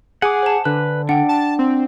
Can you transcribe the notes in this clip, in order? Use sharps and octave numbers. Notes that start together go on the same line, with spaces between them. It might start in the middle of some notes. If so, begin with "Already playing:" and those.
G#4 F#5 G#5 D6
C5 A5
D3 B4 F#6
D4 F#5 G5
A5
C4